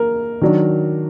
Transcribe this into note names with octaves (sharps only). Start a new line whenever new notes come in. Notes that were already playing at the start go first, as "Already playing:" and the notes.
Already playing: A#3 A#4
D#3 F#3 D4